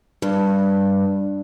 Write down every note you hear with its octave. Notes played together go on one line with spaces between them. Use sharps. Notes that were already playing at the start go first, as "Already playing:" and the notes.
G2